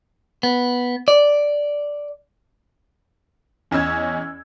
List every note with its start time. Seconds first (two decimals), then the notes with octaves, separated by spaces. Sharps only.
0.43 B3
1.08 D5
3.71 E2 C#4 D#5 E6 G#6